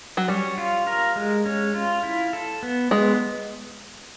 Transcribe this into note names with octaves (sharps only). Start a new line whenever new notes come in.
F#3
G3 C#4
F4
A#4
G#3
C#4
F4
E4
A4
B3
G#3 B3